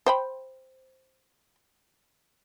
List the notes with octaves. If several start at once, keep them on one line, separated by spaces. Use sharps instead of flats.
C5 G5 B5